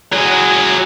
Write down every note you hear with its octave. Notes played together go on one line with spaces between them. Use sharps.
F#3 G#4